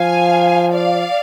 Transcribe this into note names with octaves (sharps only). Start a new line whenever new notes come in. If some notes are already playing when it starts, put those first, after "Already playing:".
Already playing: F3 F5 G#5
D5 F5